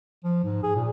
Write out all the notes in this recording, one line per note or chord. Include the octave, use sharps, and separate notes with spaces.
F3
G#2
G#4
A#2